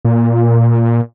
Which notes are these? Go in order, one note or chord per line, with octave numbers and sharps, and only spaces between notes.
A#2